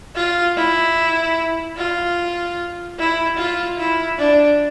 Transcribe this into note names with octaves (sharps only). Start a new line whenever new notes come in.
F4
E4
F4
E4
F4
E4
D4